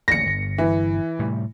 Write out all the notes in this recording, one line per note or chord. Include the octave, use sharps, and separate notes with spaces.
D1 A1 A#6 C#7
G1
E3
A2 C3 G3